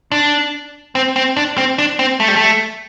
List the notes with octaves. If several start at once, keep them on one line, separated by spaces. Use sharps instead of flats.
D4
C4
C4
D4
C4
D4
C4
A3
G3
A3